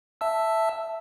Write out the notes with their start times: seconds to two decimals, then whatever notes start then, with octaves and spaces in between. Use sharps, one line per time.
0.21 E5 A5 E6